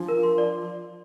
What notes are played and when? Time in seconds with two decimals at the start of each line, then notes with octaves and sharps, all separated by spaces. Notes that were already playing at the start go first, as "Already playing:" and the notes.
Already playing: F3 D4
0.08 A#4
0.23 C6
0.38 D5